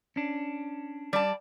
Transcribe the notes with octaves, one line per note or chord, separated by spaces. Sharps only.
C#4 D4
G3 D5 A5